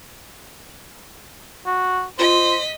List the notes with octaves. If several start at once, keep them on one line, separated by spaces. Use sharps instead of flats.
F#4
F4 C5 D#5 B6